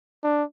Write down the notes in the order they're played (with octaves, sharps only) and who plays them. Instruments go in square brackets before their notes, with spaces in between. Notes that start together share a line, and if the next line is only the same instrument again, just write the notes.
[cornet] D4